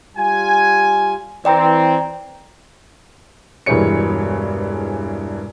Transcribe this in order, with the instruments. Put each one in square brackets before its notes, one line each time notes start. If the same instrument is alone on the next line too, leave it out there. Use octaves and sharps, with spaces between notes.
[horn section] G3 F4 G#5
[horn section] E3 C4 [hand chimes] D5 G5 A#5
[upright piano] E1 G2 E3 G#4 C#5 C#7